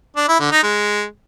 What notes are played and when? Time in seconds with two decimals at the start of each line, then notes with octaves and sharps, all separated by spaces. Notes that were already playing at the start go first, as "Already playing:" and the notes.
0.17 D4
0.28 E4
0.40 D3
0.52 D#4
0.63 G#3